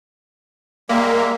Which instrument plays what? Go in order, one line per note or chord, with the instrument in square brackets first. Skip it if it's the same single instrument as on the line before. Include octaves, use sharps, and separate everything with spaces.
[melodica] G3 G#3 E5 [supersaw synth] A#3